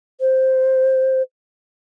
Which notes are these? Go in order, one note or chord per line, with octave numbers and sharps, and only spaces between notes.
C5